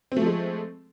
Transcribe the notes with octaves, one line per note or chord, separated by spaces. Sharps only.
F3 G#3 A3 C4